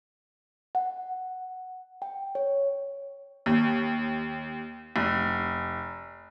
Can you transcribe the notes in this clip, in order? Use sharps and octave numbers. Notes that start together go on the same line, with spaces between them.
F#5
G5
C#5
D#2
F1